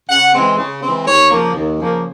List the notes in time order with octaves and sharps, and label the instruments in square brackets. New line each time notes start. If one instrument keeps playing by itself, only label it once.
[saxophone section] C#3 F#5
E3 G#3 C4
C#3
E3 G#3 C4
D#2 C#5
C#3 F3 A#3
D#2
C#3 F3 A#3